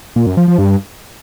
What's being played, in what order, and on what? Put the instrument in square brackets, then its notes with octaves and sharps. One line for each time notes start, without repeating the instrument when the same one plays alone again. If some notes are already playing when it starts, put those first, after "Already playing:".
[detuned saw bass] A#2
F#2
F3
F3
G2